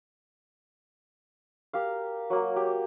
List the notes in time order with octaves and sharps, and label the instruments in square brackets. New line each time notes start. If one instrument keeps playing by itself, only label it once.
[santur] G4 A#4 F5
F#3 A#3
G4